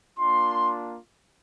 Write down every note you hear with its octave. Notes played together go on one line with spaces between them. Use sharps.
A#3 D4 F4 C6